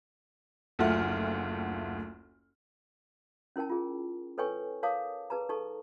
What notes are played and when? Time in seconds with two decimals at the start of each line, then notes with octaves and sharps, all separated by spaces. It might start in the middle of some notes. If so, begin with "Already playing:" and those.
0.79 F#1 D2 A3 F4 F#5 F6
3.56 C#4 E4 A#4 G5 A5
3.70 F4 G#4
4.38 A4 B4 C#5 G5 G#5 C#6
4.83 A#4 C#5 F5 A5 D6 D#6
5.30 G#4 B4 A5 A#5
5.49 D#4 A4 A5 C#6